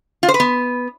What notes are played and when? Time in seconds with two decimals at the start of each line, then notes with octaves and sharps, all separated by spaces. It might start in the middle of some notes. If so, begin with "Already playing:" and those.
0.23 F4
0.29 C5
0.34 B4
0.40 B3